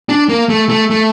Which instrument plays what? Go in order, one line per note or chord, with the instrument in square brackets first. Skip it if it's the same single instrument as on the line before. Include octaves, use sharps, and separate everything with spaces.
[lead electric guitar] D4
A#3
A3
A3
A3